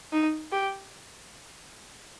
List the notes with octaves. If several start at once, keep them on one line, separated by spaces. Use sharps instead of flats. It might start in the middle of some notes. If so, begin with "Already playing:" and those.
D#4
G4